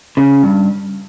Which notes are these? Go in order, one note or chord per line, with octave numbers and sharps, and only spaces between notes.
C#3
G2